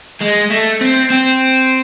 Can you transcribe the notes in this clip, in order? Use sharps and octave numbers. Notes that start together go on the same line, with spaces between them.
G#3
A3
C4
C4